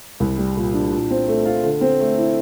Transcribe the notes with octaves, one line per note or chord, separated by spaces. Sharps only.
C2
G3
A#2
D4
A#2
C4
A3
F4
D3
C4
A3
E4